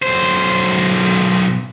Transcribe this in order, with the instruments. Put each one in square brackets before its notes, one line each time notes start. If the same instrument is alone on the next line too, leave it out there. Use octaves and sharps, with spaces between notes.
[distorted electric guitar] B1 C5